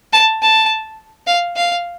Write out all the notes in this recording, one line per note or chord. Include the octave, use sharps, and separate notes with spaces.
A5
A5
F5
F5